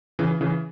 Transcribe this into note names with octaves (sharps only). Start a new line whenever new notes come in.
C#3 E3
C#3 E3